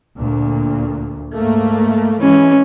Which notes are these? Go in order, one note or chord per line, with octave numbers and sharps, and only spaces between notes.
D2 A#2
G#2 A3 A#3
E3 G#3 C#4